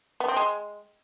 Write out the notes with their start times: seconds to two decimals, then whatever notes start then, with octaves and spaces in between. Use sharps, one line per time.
0.20 B3
0.28 C4
0.36 G#3